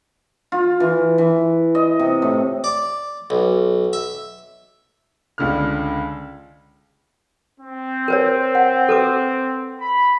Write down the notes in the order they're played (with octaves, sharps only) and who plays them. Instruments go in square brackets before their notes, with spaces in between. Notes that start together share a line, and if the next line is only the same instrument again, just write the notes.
[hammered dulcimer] F4
E3
E3
D#5
C3
A2
[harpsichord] D5
B1
E5
[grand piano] C#2 D3 F6
[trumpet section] C4
[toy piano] A#4 B4 C#5
F#5
A4 B4 D6
[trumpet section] B5